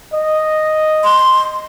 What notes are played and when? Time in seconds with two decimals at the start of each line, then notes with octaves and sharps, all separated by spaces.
0.13 D#5
1.04 C6